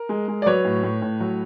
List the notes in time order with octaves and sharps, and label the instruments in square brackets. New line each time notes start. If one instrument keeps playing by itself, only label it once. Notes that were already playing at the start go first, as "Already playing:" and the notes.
Already playing: [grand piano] A#4
G#3
G#3
D5
F#3 B4 C#5
A2
A2
A2
F#3